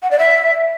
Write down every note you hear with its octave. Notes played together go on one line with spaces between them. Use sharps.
F#5
D5
E5